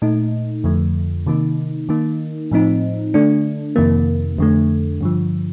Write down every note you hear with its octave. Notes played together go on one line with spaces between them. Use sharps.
A#2 A3 D#4
F2 D3 F3 A3
C3 D#3 A#3 D#4
D#3 A#3 D#4
A2 F3 C4 D#4
D3 A3 D4
F2 C3 D#3 A#3
F2 D3 A3
G2 D3 F3